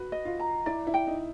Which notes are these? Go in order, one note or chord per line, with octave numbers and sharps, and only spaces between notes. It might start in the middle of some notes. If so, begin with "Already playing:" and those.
Already playing: F#4 B4
D#5
F4
A#5
E4 D5
E4
G5
D#4